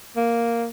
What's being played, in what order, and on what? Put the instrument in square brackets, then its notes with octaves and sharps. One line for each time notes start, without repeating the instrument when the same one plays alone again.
[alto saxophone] A#3